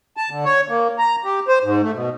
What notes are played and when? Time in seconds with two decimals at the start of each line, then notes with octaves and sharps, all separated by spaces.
0.17 A5
0.30 D3
0.45 C#5
0.69 A#3
0.99 A#5
1.24 G4
1.48 C5
1.64 G#2
1.82 A3
1.95 B2